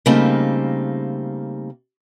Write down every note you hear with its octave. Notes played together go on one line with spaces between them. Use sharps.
C#3 G3 A3 A#3 C4 D#4